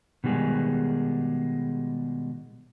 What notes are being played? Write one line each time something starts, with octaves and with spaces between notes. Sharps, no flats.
B2 D#3 G3 G#3 G#4